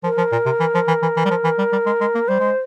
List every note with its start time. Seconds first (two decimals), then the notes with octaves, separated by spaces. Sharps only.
0.04 F3 A#4
0.18 F3
0.32 A#2
0.46 C3
0.60 E3
0.75 F3
0.88 E3
1.02 E3
1.17 E3
1.25 G3
1.30 F3
1.44 E3
1.58 G3
1.73 G3
1.86 G#3
2.01 G#3
2.15 A#3
2.28 G3 C5
2.40 G#3